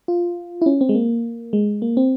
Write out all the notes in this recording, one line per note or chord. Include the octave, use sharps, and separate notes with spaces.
F4
E4
C#4
C4
G#3
A#3
G#3
A#3
C4